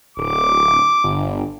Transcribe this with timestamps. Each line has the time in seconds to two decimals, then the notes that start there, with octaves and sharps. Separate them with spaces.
0.17 D1 D6
1.04 G1